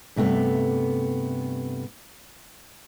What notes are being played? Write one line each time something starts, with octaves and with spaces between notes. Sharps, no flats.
G2 C3 A3 B3